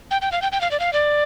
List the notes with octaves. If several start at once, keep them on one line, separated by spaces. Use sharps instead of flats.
G5
G5
F5
G5
G5
F5
D5
F5
D5